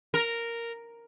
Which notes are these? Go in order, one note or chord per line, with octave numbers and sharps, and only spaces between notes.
A#4